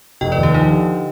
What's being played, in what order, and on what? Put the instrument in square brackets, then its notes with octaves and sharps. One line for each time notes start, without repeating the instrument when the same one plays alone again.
[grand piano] F1 [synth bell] D#5 G5
[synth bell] B4 D5
[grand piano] D#2
[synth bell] G4 B4
[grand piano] F3 [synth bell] D#4 G4
[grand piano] D3